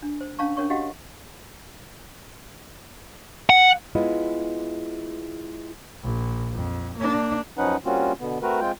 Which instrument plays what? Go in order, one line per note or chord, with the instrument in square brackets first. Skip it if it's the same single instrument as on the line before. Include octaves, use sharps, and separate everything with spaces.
[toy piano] D4
C5
C#4 D4 F5 A5 C#6
C#4 D4 A#4 C#5 C#6
F#4 G4 D#5 F5 F#5
[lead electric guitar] F#5
[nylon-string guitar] G#3 B3 E4 F4 D#5
[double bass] A#1
F2
A#3 D4
[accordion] F#2 F3 C#4 D#4 B4 F#5
G3 A#3 C4 C#4 F4 F#4
B2 D3 B3
A3 C4 F#4 A#4 B4
G#3 C4 F4 G5